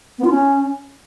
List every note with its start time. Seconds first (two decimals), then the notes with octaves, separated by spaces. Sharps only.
0.19 B3
0.25 F4
0.30 C#4